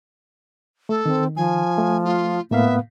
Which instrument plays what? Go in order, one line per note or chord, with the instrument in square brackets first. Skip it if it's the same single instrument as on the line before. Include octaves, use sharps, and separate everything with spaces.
[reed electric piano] A3 [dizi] A4
[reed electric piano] D#3 [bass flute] C4
[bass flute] F3 [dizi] G#5
[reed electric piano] A3
[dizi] F4
[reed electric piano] A2 A#3 F5 [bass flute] B3 [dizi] E5